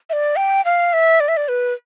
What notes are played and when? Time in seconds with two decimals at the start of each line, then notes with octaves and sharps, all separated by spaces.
0.10 E5
0.13 D5
0.36 G5
0.65 F5
0.93 E5
1.20 D5
1.28 E5
1.37 D5
1.48 B4